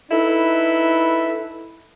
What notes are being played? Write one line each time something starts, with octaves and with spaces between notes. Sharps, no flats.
D#4 E4 A4 B4